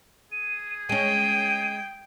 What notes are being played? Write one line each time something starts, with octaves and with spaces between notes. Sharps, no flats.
G#4 D#7
G#3 C#4 G5 D#7